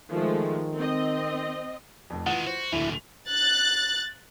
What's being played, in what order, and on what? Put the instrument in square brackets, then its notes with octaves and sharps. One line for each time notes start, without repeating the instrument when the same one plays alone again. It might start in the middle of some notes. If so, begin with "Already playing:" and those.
[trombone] D#3 [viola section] F3 G#3 A3
[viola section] C4 D#5
[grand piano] F1 F2
[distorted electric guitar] D#3 G#3 [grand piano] E3 F4 A6 [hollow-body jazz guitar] F#5
[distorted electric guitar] F#4 [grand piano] C5
[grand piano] D1 D3 [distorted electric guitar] A#2 E3 [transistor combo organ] E4
[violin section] F#6 A6